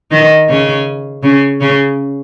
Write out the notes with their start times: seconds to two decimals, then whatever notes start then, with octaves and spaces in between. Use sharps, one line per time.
0.11 D#3 D#4
0.49 C#3 C#4
1.23 C#3 C#4
1.61 C#3 C#4